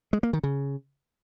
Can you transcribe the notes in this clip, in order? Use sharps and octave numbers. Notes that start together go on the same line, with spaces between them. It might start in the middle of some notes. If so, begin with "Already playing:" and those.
G#3
A#3
D#3
C#3